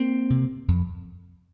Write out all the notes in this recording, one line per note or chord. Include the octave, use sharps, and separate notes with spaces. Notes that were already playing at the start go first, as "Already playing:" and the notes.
Already playing: A#3 C4
C3
F2